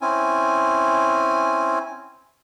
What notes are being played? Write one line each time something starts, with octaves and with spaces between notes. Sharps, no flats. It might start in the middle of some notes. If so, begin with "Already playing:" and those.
C4 C#4 E4 G#5